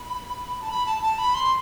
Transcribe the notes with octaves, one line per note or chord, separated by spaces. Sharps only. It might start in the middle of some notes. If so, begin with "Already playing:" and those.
Already playing: B5
A5
B5
A5
A5
B5
C6